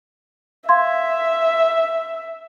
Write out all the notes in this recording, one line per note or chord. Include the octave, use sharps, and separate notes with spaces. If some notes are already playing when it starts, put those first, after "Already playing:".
E5 F5 C6 G#6